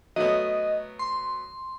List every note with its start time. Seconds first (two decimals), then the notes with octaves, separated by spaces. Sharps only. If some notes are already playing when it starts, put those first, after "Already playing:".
0.16 F#3 A3 B3 D#5
0.99 C6